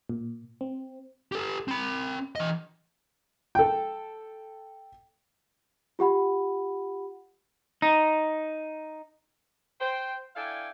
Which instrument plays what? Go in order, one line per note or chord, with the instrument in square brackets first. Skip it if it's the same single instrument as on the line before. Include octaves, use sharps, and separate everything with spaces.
[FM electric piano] A#2
C4
[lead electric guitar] G4 A4
C4 B5
E3 D#5
[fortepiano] A4 G5
[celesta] F4 G4 F#5 B5
[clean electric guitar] D#4
[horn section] C5 G5
D4 E4 A4 F5 G5 G#5